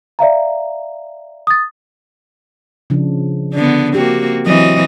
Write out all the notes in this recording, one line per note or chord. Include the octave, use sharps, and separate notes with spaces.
D5 E5 F5 A#5
D#6 A6
C#3 F3 D4
D3 B3
A#3 C4 F#4 G4
E3 F#3 C4 D#5